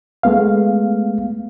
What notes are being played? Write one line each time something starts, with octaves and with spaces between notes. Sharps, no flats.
G#3 A3 B3 F5